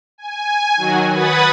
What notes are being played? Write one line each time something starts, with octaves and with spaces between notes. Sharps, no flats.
G#5
D#3 F#3 F#4
B4 F#5 B5 D#6 G#6 A6